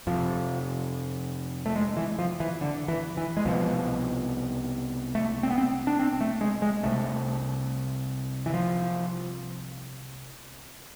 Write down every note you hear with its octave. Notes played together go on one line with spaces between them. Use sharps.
F2 C3 F3
A3
G#3
E3
F3
E3
D3
E3
E3
G#3
C2 B2 F3
A3
C4
B3
C4
D4
C4
A3
G#3
G#3
C2 C3 A3
E3
F3